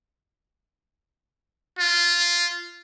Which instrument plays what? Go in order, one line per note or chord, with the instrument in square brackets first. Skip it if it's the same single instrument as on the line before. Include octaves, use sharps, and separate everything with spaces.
[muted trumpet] F4